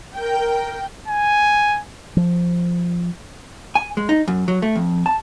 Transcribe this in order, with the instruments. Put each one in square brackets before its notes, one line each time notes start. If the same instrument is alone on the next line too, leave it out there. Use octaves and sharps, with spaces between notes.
[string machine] A#4 [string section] G5
[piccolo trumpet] G#5
[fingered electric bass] F3
[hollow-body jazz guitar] G#5
G#3
D#4
F#2
F#3
A3
F2
A5